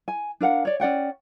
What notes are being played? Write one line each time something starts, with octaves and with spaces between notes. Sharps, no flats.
G#5
D4 A#4 F5 F#5
C#5 D5
C#4 D5 F#5 G5